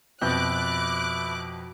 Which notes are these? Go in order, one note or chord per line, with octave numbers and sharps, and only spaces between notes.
F2 B2 B4 E5 D6 F#6 G6